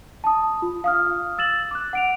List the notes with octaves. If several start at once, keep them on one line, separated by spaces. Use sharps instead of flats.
A5 D#6
F4
F5 D#6 F6
E6 A6 E7 F#7
D6 F#6
F#5 D7 F7